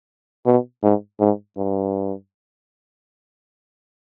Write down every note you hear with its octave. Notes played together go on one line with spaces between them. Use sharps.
B2
G#2
G#2
G2